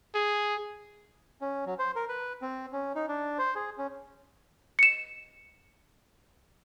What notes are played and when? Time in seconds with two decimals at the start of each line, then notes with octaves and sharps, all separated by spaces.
0.15 G#4
1.41 C#4
1.66 F#3
1.79 C5
1.96 A#4
2.09 B4
2.42 C4
2.72 C#4
2.95 D#4
3.09 D4
3.38 C5
3.55 G#4
3.78 C#4
4.79 C#7 E7